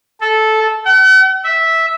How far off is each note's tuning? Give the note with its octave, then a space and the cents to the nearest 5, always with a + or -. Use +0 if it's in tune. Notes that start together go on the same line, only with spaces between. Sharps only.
A4 -10
F#5 +45
E5 -10